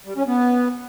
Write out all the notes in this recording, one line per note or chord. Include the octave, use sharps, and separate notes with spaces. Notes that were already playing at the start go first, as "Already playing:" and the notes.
G3
C#4
B3